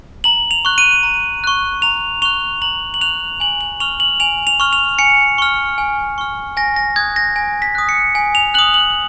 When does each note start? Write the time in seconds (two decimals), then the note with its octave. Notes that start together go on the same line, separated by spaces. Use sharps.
0.24 A#5 F#7
0.51 F7
0.65 C#6 F#6
0.78 D#7
1.03 A#5
1.44 C#6 F#6
1.82 A#5 F7
2.22 C#6 F#6 F7
2.62 A#5 F#7
2.94 F#7
3.01 C#6 F#6 F7
3.40 G#5 F#7
3.61 F#7
3.80 C#6 F6 F7
4.00 F#7
4.20 G#5 F7
4.47 F7
4.60 C#6 F6
4.73 F7
4.99 G#5 C#7
5.38 C#6 F6
5.78 G#5
6.18 C#6 F6
6.57 G#5 A#6
6.76 A#6
6.96 D#6 F#6 G#6
7.16 A#6
7.36 G#5 A#6
7.62 B6
7.75 D#6 F#6
7.89 C#7
8.15 G#5
8.35 F7
8.54 D#6 F#6 F#7
8.74 F#7